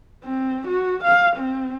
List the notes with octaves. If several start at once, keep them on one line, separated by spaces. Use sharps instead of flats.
C4
F#4
F5
C4